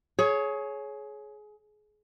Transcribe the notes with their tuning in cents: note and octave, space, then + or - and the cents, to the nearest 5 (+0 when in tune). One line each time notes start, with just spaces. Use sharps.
G#4 +25 C#5 +0